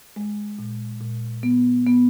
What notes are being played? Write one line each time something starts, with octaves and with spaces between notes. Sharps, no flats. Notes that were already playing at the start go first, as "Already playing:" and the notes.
G#3
A#2
A#2
B3
B3